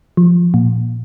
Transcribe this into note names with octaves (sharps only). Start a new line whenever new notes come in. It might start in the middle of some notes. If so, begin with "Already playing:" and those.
F3
A#2